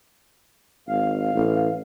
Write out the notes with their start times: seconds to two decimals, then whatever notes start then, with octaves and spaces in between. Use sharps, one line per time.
0.88 G#1 F5
1.34 A1